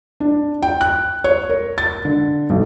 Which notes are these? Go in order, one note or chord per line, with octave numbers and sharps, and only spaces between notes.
D4
G5
F#6
C#5
A#4
A6
D3
B1